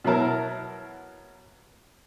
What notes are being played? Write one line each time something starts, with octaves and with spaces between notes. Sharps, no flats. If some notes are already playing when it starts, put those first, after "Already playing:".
B2 F#3 E4 A#4 A5